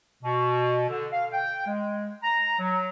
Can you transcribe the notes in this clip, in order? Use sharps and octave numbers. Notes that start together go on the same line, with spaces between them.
B2
D3
F5
G5
G#3
A#5
F#3